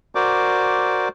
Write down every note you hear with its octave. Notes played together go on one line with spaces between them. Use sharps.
F#4 A#4 C5 D5 D6